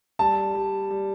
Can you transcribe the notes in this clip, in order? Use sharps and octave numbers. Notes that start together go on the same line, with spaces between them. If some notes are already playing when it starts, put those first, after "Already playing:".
G3 A5
G3
G3